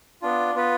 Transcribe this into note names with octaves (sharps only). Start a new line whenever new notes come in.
B3 D4 F4
B3 F4 B4